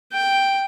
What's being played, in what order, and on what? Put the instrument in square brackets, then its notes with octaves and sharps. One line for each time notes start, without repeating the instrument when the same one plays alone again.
[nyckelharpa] G5